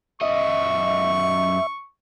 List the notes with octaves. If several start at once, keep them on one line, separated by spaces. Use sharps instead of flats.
F#2 D#5 E5 C#6